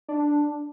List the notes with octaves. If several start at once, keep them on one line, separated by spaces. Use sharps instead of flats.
D4